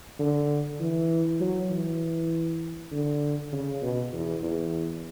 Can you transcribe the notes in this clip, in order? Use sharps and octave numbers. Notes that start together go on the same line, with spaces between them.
D3
E3
F#3
E3
D3
C#3
B2
E2
E2